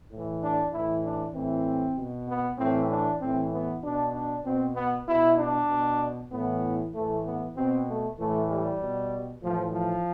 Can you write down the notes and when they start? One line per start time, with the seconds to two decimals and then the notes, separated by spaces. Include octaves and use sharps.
0.10 A2 E3
0.41 D4
0.73 A2 E3 E4
1.04 D4
1.35 A2 E3 C4
1.97 B2
2.28 B3
2.59 A2 E3 C4
2.90 D4
3.21 A2 E3 C4
3.52 B3
3.83 B2 D4
4.14 D4
4.45 B2 C4
4.76 B3
5.07 B2 E4
5.38 D4
5.70 B2
6.31 A2 E3 B3
6.94 A2 E3 A3
7.25 B3
7.56 B2 C4
7.87 A3
8.18 A2 E3 A3
8.50 G3
8.81 B2
9.42 A2 E3 F3
9.73 F3